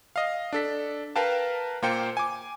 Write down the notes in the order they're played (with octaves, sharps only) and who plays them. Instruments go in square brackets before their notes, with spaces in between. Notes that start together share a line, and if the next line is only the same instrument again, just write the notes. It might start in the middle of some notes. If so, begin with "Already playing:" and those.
[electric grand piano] D#5 F5
D4 A4 B6
A#4 B4 F5 G5 A5
A#2 A#3 F4 C5 G5 C#7
G#5 D6